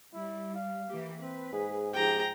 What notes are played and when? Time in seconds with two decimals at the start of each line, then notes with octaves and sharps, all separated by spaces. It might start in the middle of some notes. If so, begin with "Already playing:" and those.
0.13 G3 E4
0.55 F5
0.89 E3 A#3 G4
1.20 C4 B4
1.53 G#2 G#4
1.93 F3 D#4 G4 G#4 G5 A#5